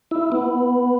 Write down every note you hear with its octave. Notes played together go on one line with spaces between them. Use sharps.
E4
B3